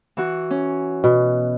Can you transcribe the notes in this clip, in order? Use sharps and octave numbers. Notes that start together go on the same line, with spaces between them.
E3 F#4
C#4
B2